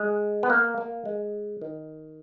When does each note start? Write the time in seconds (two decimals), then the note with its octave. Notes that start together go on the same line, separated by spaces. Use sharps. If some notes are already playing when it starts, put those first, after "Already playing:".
Already playing: G#3
0.43 B3
0.50 A#3
0.78 A#3
1.06 G#3
1.61 D#3